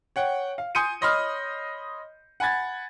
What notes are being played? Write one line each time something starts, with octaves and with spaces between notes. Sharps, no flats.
C#5 F#5 G5
F5
G#5 C6 D#6 G6 C#7 D#7
C#5 D#5 B5 C6 D#6 F6
F#5 G#5 B5 G#6 A6